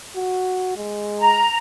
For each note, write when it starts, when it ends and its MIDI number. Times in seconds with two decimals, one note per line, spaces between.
0.16 0.72 66
0.76 1.47 56
1.19 1.58 82